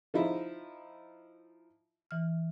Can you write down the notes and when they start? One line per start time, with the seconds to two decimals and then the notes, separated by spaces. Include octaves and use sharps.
0.14 F3 D#4 E4
2.11 E3 F6